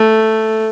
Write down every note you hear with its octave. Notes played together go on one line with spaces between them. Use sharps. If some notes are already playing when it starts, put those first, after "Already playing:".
Already playing: A3